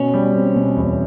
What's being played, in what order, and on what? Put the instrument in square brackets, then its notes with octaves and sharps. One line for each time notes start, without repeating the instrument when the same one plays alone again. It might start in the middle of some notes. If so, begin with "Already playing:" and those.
Already playing: [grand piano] B2 [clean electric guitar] C#4
[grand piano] G3
C4
B2
E2